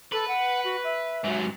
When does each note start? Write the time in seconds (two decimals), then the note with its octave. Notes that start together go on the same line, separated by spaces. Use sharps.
0.12 A4 B4
0.28 F#5
0.64 F#4
0.84 E5
1.24 G#2 F#3